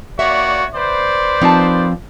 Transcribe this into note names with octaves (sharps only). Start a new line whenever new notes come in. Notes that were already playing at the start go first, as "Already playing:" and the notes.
A#3 F#4 C#5 D5 E5
B4 C5 D5
F3 C4 D#4 A#4 A5